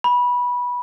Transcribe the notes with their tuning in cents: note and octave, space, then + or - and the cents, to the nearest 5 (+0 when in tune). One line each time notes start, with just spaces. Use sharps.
B5 -15